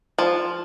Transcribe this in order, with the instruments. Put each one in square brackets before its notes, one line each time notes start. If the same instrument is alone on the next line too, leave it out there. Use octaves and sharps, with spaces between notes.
[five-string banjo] F3